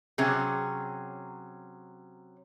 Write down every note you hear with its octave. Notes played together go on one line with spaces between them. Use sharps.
C3 F#3 C#4 G#4